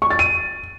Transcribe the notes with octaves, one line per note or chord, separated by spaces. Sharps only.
C#6
A6
D#7